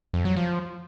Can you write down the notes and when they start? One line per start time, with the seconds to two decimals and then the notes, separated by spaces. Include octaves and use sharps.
0.13 F2
0.25 F#3
0.37 F3